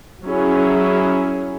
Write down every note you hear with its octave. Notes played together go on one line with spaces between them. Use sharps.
F#3 C#4 E4 G#4